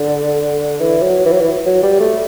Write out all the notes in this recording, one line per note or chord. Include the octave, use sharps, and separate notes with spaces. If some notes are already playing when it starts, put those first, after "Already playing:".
Already playing: D3
E3
F#3
E3
F#3
E3
F#3
G3
A3